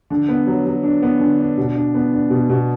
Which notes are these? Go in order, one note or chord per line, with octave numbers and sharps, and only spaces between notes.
D3
B3
F#3
F#3
D4
B3
D3
D4
B2
D4
B3
D4
B2
B2